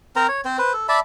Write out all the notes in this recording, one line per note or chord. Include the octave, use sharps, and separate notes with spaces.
C4 A#4 C5 A#5
C#5
C4 C5
B4 C5
A4
D5 E5 A5 B5